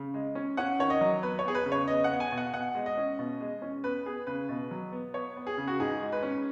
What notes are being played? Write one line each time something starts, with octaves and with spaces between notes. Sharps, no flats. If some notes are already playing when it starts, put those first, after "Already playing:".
Already playing: C#3
G#3
C#4
C#4 F#5
D#3 C#5
D#5
F#3
B3 B4
C#5
B3 G#4
B4
C#3
C#5
B3 D#5
F#5
B3
G#5
B2
F#5
B2 F#5
G#3
D#5
C#4
B2
G#3
C#4
B3 B4
B3 G#4
C#3 B4
B2
F#3
B3
B3 C#5
B3
G#4
C#3
F#4
G#2 G#4
G#3
B4
C#4